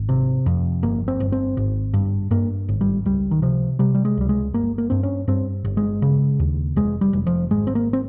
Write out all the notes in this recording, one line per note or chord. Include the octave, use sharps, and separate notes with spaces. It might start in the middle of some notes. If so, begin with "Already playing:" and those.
Already playing: G#1
C3
F2
G1 A#3
C4
G1
C4
G#1
G2
G2 A#3
G#1
G3
C#2 G3
D#3
C3 F3
C3 G3
G3
G#3
C#2 G3
G#3
G1 A#3
A#3
G2 C4
C#4
G2 C4
G1
G#3
C#3
D#2
F1 G#3
G3
F1
F3
G#1 G#3
C4
A#3
C4